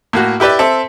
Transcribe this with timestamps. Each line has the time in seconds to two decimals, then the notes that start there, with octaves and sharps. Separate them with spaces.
0.13 A2 A#3 F#4
0.40 E4 G4 B4 D5 E5
0.59 C4 A4 E5